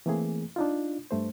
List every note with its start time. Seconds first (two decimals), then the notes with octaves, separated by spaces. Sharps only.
0.06 E3 A3 A#3 C4 G#4
0.56 D4 D#4 F4
1.11 G2 A3 C5